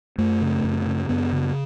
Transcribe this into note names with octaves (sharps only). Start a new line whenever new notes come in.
F#2 A3
C#3
F#2
C#3
F#2 B3
C#3